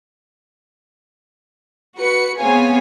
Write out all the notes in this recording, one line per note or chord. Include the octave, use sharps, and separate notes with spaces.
F#4 B4 C#7
B3 C4 G#4 C#5 F5 G#5